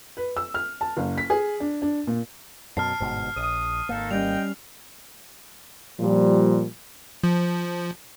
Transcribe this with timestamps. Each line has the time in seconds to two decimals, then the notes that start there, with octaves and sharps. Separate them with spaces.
0.17 B4
0.37 E6
0.54 F6
0.81 A5
0.97 F#1
1.18 B6
1.30 G#4
1.60 D4
1.82 D4
2.07 A#2
2.77 F#2 B2 A5 F6 C7
3.00 G1 G#2 B2
3.36 A#1 D#6
3.89 G#1 D#3 A#3 D#4 A4
4.11 G3 C#4 D#5 G5 F7
6.00 A#2 F3 G3
7.24 F3